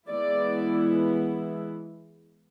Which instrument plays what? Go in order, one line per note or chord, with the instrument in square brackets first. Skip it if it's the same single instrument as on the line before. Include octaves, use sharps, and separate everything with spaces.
[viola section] E3 G#3 B3 E4 D5